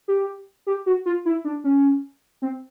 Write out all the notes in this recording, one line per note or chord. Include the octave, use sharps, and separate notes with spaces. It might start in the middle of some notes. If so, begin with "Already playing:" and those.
G4
G4
F#4
F4
E4
D4
C#4
C4